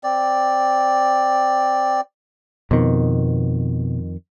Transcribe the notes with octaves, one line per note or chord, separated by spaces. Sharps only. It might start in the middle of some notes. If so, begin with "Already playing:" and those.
C4 D5
F2 B2 D#3 B3